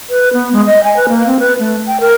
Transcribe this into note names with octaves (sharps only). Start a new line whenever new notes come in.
B4
B3
G#3
D#5
G#5
B4
A#3
C4
B4
A3
G5
A#4